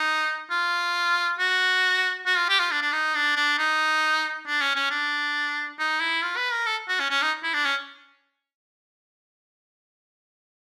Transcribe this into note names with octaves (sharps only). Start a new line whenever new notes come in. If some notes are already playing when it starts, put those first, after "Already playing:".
Already playing: D#4
F4
F#4
F#4
F4
G4
F4
D4
D4
D#4
D4
D4
D#4
D4
C#4
C#4
D4
D#4
E4
F4
B4
A#4
A4
F#4
C#4
C#4
D#4
E4
D4
C#4